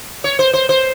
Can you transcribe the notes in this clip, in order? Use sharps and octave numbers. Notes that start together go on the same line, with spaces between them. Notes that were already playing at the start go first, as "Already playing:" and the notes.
C#5
C5
C5
C5